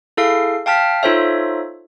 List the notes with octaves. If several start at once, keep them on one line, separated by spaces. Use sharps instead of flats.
E4 G#4 A4 F5 C7
F5 G5 A5 F6 B6
D#4 F4 A4 C5 C#5 E5